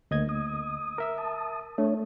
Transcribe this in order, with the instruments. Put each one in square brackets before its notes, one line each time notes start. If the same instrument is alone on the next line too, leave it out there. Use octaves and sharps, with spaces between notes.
[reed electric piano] D2 D#5 G#6 [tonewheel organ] A#3
[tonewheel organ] D#6
[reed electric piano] A#4 E5 E6
[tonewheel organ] A5 D#6
[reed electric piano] A3 [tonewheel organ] D4 C#5